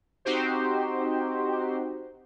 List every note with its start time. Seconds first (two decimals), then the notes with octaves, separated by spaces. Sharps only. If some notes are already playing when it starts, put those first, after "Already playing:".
0.25 C4 D#4 F#4 G4 C5